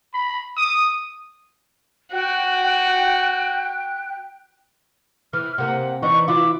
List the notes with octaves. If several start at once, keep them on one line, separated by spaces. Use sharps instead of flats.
B5
D#6
F#4 G5 F#6
E3 F6
C3 A#3 F#5
E3 D4 D#4 C#6
E3 E4 F4 D6